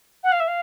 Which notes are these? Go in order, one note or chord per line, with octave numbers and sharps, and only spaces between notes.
F#5
F5
E5
F5